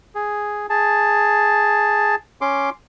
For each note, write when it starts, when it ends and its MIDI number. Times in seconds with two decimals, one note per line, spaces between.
0.15 0.66 68
0.70 2.15 68
0.70 2.15 81
2.41 2.70 61
2.41 2.70 84
2.41 2.70 86